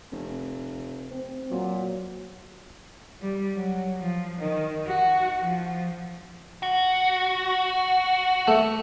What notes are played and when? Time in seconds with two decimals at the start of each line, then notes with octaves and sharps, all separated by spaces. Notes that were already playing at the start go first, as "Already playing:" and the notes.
0.12 F1
1.10 C4
1.51 A#2 F#3
3.21 G3
3.55 F#3
4.00 F3
4.39 D#3
4.87 F#4
5.41 F3
6.63 F#4
8.48 A3